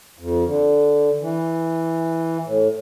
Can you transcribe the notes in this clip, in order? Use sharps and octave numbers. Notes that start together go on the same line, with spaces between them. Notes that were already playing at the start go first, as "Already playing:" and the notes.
F2
D3
E3
A2